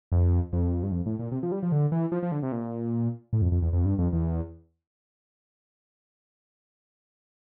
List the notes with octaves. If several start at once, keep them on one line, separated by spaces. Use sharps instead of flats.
F2
F2
G2
F2
A2
A#2
C3
F3
G3
F3
D3
E3
F3
F3
D3
C3
A#2
A2
F2
F2
E2
F2
G2
F2
E2